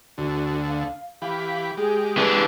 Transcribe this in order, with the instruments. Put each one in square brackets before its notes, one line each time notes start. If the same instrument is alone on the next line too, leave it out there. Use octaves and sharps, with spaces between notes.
[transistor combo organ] D2 D3 [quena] F#4
[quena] F5
[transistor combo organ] E3 G4 B5 [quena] F5
[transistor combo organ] G#3 G4 [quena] G#4
[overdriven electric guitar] E3 D4